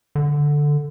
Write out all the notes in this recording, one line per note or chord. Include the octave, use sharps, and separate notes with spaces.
D3